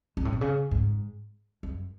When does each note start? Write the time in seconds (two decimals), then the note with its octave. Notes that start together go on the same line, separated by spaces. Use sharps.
0.17 G#2
0.25 A2
0.33 B2
0.41 C#3
0.71 G#2
1.63 F#2